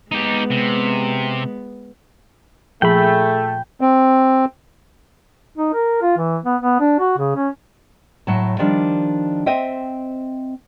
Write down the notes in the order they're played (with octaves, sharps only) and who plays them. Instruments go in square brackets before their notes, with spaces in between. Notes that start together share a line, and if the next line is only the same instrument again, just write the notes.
[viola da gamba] G#3 B3 [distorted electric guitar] D#4 G4
[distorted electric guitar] C3
[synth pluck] A#2 F3 G#4 [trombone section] A3 [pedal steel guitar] G5 B5
[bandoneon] C4
[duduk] D#4
A#4
F4
E3
B3
B3
D4
F#4
C#3
C#4
[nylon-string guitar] A2 F#3 A5
D#3 F3 G3 D4
C4 C5 D#5 E5 G5